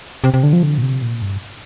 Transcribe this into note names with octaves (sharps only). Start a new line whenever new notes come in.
C3
C3
D3
F3
D3
A#2
C3
A#2
G2